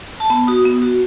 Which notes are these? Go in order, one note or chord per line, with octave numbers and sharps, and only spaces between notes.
A5
B3 B5
F#4 D#6
B3
F#4